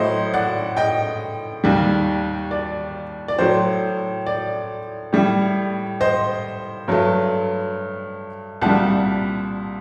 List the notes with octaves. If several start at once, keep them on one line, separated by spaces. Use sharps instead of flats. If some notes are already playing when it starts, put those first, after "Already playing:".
Already playing: A2 F#3 A3 C5 D#5
D5 F#5
D#5 G5
D#2 D#3 G3
D5
D5
A2 F#3 A3 C5
D5
A2 G3
C5 D#5
G2 F#3 A3
C2 A#2 G3 F#5 A5